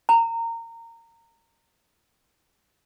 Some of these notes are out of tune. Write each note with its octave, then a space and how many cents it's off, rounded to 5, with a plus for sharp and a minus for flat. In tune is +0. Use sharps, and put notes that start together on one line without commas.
A#5 -25